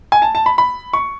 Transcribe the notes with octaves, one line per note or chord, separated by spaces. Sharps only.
G#5
A5
A5
B5
B5
C#6